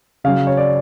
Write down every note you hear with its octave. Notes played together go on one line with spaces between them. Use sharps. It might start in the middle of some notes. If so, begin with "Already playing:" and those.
C#3 F#3 F5
C#5
D5